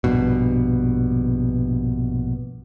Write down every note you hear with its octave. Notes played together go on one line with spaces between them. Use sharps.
A#1 G2 B2